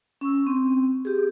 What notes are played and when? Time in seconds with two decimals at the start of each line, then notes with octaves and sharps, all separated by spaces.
0.21 C#4 C#6 E6
0.47 C4
1.05 G4 G#4